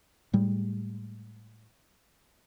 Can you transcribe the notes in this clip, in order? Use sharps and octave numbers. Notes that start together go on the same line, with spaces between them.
A2 G3 G#3